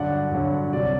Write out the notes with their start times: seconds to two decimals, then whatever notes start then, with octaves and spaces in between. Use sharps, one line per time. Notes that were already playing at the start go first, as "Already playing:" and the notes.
Already playing: G2 D3 F#3 D5 F#5
0.31 G2 D3 F#3
0.73 C2 C3 F#3 D5